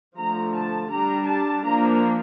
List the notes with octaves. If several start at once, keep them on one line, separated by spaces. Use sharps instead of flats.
D3 F3 A3 A#5
A5
G3 D4 A#5
A5
F3 A#3 D4 A#5